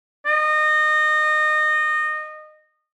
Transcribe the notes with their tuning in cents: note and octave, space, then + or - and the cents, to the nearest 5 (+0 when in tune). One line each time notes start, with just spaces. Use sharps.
D#5 -25